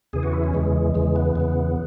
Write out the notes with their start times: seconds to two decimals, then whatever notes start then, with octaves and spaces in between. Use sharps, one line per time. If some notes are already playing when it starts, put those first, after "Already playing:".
0.13 E2 C#3 E3 G#4
0.23 F#4
0.33 E4
0.44 C#4
0.53 E2 C#3 E3 G#3
0.95 E2 C#3 E3 G#3
1.16 B3
1.35 E2 C#3 E3 B3